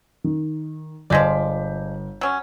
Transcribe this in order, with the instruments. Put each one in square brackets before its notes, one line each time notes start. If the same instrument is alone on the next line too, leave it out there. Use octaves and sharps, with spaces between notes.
[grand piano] D#3
[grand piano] G1 G6 B6 [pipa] F3 G#3 D5
[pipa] F#3 C#4